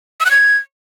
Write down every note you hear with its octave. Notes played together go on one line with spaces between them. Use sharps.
E6
F#6
G#6